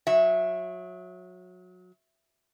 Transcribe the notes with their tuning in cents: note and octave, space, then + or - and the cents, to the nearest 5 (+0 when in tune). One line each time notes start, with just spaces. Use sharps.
F#3 -25 E5 +0